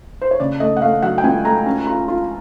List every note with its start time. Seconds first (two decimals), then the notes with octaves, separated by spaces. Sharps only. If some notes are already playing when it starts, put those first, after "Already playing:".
0.21 C5
0.31 C#5
0.40 C#3 D5
0.60 A3 D#5
0.77 F#5
0.82 A3 F5
1.02 F#3 F#5
1.18 G5
1.23 C#2 G#5
1.45 A3 A#5
1.66 C#4
1.87 F4
2.08 F4